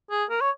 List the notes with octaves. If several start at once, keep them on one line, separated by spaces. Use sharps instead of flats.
G#4
A#4
C#5